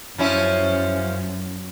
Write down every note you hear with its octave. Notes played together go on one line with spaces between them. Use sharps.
F#2 F3 C#4 E4